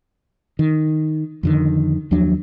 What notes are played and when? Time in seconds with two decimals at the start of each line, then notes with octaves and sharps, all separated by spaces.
0.59 D#3
1.43 F2 D3 D#3
2.11 D#2 F3 F#3 D4